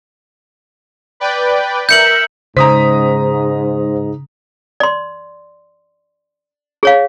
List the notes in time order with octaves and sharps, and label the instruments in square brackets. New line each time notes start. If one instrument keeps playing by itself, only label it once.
[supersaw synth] B4 D5 G5
[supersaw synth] A#4 E5 [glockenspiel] G6 C#7 F#7
[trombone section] G#2 [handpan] C#3 [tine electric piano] C5 [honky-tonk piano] A#5 D#6 B6
[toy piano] D5 C6
G#4 C#5 F5